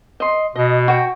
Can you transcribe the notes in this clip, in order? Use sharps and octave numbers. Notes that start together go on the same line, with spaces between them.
D#5 C6
B2 D#5
F#4 G5